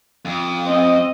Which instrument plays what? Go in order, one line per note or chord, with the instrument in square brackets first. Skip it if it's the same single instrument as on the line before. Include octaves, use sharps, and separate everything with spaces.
[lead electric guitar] F2
[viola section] C4 D#5